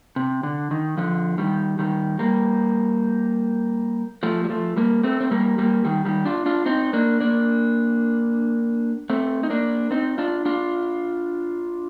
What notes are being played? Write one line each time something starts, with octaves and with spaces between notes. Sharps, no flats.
C3
D3
D#3
D3 F3
D#3 G3
D#3 G3
G3 A#3
F3 A3
G3
F3 A3
G3 A#3
A3 C4
C4
G3 A#3
G3 A#3
D#3 G3
D#3 G3
D4 F4
D4 F4
C4 D#4
A#3 D4
A#3 D4
A3 C4
D#4
A#3 D4
C4 D#4
D4 F4
D4 F4